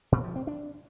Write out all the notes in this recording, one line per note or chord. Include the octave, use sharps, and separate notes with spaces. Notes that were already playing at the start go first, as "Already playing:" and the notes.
A#2
F3
C4
D4